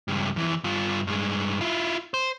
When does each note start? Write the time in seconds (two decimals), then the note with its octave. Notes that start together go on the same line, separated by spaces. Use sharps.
0.08 C#2 G2
0.36 F2 E3
0.64 G2 F4
1.07 G2 G#3
1.61 E4 F4
2.14 C5